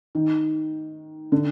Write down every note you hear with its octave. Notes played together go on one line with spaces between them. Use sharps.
D#3
D3